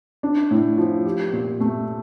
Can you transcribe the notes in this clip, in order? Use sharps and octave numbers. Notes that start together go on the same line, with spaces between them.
D4
A2
F3
G4
A#2
A3